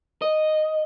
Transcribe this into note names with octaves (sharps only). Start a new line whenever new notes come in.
D#5